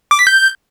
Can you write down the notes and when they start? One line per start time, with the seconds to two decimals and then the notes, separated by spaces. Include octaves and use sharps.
0.11 D6
0.19 B6
0.27 G6